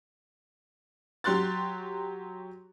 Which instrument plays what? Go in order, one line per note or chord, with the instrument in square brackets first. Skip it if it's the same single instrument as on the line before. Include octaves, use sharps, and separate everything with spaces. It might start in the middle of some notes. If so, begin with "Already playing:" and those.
[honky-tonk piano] F#3 G4 C6 F#6 A6